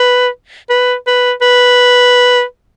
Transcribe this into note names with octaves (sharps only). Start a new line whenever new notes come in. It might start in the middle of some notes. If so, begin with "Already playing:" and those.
Already playing: B4
B4
B4
B4